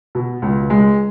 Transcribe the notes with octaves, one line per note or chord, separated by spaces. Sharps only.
B2
C#2
G#3